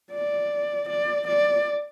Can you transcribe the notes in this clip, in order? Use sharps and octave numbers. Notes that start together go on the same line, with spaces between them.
D5
D5
D5